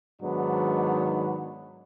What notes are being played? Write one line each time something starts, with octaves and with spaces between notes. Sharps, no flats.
G#2 D#3 F#3 B3 D4